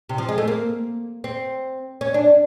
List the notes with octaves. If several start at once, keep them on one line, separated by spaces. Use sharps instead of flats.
C3
F3
G#3
A3
A#3
C4
C#4
D4